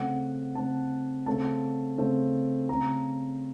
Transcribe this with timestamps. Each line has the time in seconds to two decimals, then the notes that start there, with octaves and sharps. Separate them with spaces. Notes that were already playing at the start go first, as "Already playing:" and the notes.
Already playing: C#3 A3 C4 F#5
0.55 C#3 A3 C4 A5
1.26 C#3 A3 C4 A5
1.98 C#3 A3 C4
2.69 C#3 A3 C4 A#5